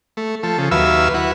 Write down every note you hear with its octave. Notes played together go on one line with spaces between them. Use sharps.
A3
F3 A4
C#3 F3
D#2 F#3 B4 E5 F5 E6
E4 F#4 B4